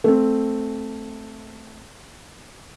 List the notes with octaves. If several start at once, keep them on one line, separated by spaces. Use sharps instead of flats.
A3 C4